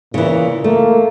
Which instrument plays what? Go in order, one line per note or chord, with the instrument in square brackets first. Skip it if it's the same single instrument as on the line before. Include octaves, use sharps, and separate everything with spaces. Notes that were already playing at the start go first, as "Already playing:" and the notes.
[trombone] A#2 [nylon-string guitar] C#3 E3
[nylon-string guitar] A3 [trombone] A#3